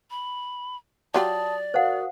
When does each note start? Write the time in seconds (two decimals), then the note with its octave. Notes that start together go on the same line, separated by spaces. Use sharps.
0.11 B5
1.14 F#3 F4 G4 D5 A5 D#6
1.74 F#4 A#4 C5 F5 F#5 D#6